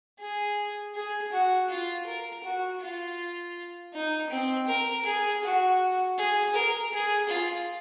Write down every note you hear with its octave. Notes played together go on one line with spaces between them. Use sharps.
G#4
G#4
F#4
F4
A#4
F#4
F4
D#4
C4
A#4
G#4
F#4
G#4
A#4
G#4
F4